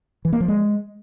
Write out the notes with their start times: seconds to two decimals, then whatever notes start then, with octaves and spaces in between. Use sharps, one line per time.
0.25 E3
0.33 A#3
0.40 F3
0.48 G#3